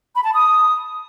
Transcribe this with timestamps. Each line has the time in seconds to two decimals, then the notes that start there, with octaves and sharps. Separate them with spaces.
0.15 B5
0.24 A5
0.34 D#6